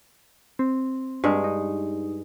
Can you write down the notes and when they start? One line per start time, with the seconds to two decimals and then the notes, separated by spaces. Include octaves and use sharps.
0.59 C4
1.24 G2 G#3
1.44 D#4